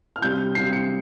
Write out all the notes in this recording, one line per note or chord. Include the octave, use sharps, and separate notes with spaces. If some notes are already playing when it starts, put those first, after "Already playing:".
F6
C3 G3 C4 G6
C3 G3 C4 C7
C#7